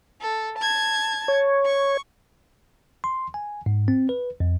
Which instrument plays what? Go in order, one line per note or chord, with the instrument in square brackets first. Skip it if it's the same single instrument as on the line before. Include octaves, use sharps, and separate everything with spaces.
[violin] A4
A5 G#6
[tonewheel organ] C#5
[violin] C#6
[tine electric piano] C6
G#5
G#2
C4
B4
F2